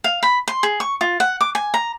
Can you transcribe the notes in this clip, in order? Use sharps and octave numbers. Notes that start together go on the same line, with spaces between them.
F5
B5
C6
G#4
C#6
F4
F#5
D6
G#5
A#5